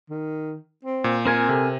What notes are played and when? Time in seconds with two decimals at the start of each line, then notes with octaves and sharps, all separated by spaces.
0.10 D#3
0.85 C4
1.04 A#2
1.26 C4 F4 A#4 G#5
1.49 C3 A4